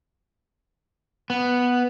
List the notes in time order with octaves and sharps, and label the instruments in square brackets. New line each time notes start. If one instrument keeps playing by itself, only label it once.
[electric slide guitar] B3